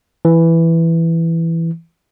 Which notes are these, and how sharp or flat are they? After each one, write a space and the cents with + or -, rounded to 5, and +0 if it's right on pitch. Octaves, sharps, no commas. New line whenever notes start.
E3 +5